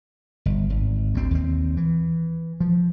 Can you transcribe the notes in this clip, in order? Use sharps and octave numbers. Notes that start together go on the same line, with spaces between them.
G1
G#1
D2 C4
D#2 C4
E3
F3